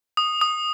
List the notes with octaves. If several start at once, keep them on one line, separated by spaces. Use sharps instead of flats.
D#6
D#6